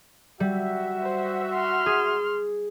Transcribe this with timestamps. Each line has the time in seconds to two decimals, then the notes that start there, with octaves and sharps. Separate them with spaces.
0.40 G3 F#4 E5
1.03 C5
1.53 C6 F6
1.86 G#4